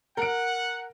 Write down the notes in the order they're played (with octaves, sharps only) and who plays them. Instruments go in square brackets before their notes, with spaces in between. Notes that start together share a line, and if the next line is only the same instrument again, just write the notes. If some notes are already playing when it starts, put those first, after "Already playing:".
[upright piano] A#4 D7 [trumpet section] F#5